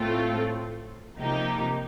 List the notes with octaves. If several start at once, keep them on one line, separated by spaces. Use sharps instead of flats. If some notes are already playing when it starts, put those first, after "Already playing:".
Already playing: A2 A3 C4 F4 A4
C3 F3 A#3 D#4 G4